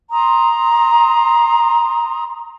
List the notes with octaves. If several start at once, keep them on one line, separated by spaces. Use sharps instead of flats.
A#5 C6 D#6